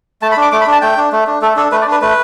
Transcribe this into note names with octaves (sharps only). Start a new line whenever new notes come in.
A3 A5
B5
D4 D6
A3 D6
B5
D4
A5
A3 G5
D4
A3
D4
A3 A4
D4 A4
A3 B4
D5
D4 B4
A3 B4